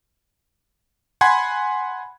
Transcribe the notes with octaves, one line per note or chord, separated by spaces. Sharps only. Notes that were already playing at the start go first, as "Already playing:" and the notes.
F#5 G#5 B5 C6 G#6